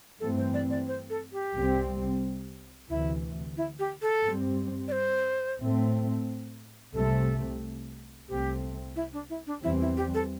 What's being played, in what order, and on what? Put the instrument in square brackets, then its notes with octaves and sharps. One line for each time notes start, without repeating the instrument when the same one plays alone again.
[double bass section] G2 E3 A3 C4 [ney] A4
[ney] C5
D5
D5
C5
A4
G4
[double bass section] C2 C3 G3 C4
[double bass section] D2 C3 E3 [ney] E4
[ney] E4
G4
A4
[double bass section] G2 G3 C4
[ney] D5
C5
[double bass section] A2 A3 C4
[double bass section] C2 C3 A3 C4 [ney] A4
[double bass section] C2 C3 A3 C4 [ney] G4
[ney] E4
D4
E4
D4
[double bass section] E2 E3 G3 C4 [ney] E4
[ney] E4
G4
A4